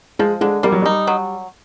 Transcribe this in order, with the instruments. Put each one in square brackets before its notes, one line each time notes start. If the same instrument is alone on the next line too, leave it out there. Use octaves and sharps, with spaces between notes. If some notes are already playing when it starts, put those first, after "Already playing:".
[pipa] F3 [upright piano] G#3
[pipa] D3 [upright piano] G#3
[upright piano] G3 [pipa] A#3
[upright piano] F#3
[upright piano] G3 [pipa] D#4
[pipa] F#3